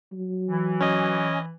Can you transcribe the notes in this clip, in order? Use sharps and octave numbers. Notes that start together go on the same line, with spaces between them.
F#3
E3
C#4 D#5